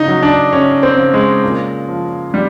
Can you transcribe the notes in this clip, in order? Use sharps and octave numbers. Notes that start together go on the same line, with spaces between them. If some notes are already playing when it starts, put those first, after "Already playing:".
Already playing: C#3 D#4
F#3
D4
C#3 C#4
C4
C#3
G#3
A#2
F3
G3